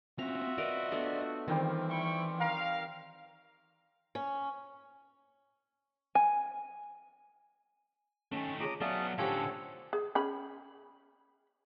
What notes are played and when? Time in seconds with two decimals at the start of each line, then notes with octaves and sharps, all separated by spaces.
0.19 C4 C#4 F4 F#4 E5 A#5
0.58 A#4 B4 D5 D#5
0.92 A3 B3 D4
1.48 D#3 E3 G3 C4 F4
1.89 E4 G5 C#6
2.40 A#4 F5
4.15 C#4
6.15 G#5
8.32 D#3 A3 C#4 G#5
8.60 F4 G#4 C#5 A#5 D6 D#6
8.81 F#3 B3 C#4 G#4 D5 E5 F5 A5
9.18 A2 D3 F3 C#4 G4 A4 C#5 F#5
9.93 G#4
10.15 C#4 G#4 B5